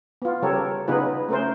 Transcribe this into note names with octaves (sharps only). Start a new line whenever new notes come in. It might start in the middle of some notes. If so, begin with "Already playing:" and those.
B3 F4
C#3 G3 G4 A4 A#4 C#5
C#3 B3 D#4 F4 G#4 B4
A3 C#4 A#4 C5